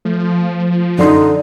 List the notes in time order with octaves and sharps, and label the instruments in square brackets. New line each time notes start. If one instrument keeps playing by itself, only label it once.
[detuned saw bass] F3 [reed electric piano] A3
[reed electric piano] F#2 C6 [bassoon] D3 [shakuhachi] D#4